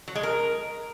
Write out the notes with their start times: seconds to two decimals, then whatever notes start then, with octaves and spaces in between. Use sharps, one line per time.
0.08 F#3
0.15 G#3
0.23 A#4